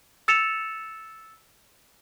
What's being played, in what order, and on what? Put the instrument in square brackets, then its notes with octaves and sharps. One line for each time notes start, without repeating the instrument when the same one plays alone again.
[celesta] E6 A6 C#7 E7 F7